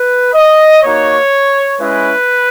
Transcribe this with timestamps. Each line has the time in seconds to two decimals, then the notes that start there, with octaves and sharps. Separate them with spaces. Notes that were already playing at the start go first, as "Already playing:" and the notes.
Already playing: B4
0.34 D#5
0.83 A#3 D#4 F#4 C#5
1.79 G#3 C#4 E4 B4